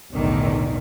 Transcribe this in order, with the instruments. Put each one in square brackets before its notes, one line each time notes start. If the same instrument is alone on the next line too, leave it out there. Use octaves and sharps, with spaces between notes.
[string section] B1 E2 A2 D3 D#3